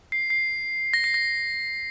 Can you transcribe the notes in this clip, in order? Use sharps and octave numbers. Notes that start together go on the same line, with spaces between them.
C7
C7
A#6
C7
A#6